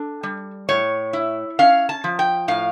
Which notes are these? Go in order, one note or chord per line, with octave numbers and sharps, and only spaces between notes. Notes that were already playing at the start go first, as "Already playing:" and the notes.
Already playing: D4 A4
G3
A2 C#5
E4
C#4 F5
A5
F3
G5
A2 F5